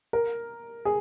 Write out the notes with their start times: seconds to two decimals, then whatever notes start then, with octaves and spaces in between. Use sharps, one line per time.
0.13 A#4
0.85 G#4